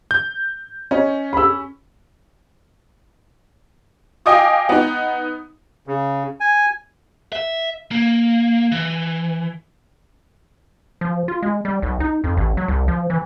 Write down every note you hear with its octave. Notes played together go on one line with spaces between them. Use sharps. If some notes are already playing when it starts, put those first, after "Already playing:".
G6
C#4 C#5 D#5
B5 E6
D#5 F5 G5 G#5 D6 D#6
B3 D#4
C#3
G#5
E5
A#3
E3
F3
F4
G#3
G3
B1
D#4
F2
A1
F#3
C2
F3
E3